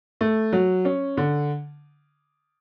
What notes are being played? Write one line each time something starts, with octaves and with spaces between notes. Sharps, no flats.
A3
F#3
C#4
D3